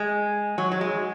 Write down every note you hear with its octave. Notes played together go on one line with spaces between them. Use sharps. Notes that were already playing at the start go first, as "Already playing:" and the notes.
Already playing: G#3
F#3
F#3
G#3